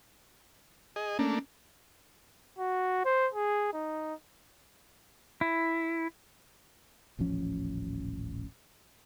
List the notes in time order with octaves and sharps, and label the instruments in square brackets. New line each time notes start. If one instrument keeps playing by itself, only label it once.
[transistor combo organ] G#4 D#5
[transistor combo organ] A3 A#3 D4 [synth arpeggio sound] C#4
[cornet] F#4
C5
G#4
D#4
[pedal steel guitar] E4
[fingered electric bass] D#1 A1 F3 C#4